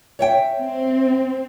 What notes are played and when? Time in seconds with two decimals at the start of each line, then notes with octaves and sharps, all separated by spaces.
0.19 C#5 E5 G5
0.57 C4